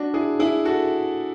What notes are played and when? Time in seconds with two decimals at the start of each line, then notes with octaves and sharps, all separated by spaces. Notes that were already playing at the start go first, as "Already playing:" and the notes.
Already playing: D4 F#4
0.14 E4 G#4
0.39 E4 G#4
0.65 F#4 A4